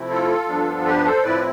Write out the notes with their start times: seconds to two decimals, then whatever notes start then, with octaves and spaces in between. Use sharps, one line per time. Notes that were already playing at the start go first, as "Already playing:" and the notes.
Already playing: C3 F3 A3 C4 E4
0.10 F4 A4
0.48 G2 F3 B3 D4
0.86 G4 B4
1.05 A4 C5
1.23 A2 F3 C4 E4 B4 D5